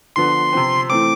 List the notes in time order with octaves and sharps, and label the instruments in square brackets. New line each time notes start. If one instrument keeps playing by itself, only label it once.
[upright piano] D3 F3 B3 [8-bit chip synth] C6
[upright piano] C3 F3 C4
[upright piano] E3 A3 C4 [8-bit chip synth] D6